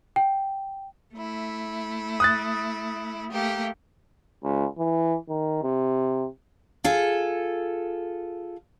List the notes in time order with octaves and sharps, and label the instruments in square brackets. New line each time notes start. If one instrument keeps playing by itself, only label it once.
[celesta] G5
[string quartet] A3 E4
[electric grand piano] D#6 F#6 A6
[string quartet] A3 A#3 G4
[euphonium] C#2
E3
D#3
C3
[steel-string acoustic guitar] F4 G#4 A4